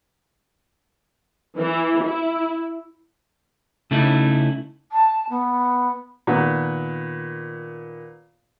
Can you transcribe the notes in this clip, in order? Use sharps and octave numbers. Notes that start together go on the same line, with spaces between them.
E3
E4
C#3 A3 D#4 E4
A5
B3
A#2 D#3 B3